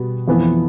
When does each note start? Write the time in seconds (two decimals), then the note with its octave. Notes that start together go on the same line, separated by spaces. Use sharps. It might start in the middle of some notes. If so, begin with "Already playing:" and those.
Already playing: B2 G3 B3
0.28 F2 E3 B3